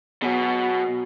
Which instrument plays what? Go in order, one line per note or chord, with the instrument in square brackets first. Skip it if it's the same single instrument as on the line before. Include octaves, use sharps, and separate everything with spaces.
[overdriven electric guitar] B2 [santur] F#3 G#4